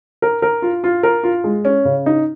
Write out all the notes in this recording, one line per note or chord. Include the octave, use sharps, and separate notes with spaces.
A#4
A#4
F4
F4
A#4
F4
G#3
C#4
C#3
D#4